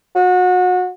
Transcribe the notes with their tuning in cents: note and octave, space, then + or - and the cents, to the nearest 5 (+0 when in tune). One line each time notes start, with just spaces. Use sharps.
F#4 -30